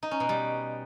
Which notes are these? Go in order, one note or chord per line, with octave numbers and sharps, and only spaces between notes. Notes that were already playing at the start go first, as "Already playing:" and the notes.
D#4
C#4
B2
G3